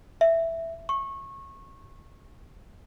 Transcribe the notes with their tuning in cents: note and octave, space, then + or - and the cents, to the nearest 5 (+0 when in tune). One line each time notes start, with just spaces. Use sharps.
E5 +5
C#6 -25